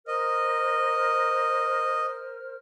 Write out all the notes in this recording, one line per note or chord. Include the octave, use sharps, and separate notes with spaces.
A#4 C5 D#5 F6